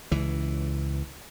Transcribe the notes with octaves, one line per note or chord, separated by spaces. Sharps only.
C#2 E3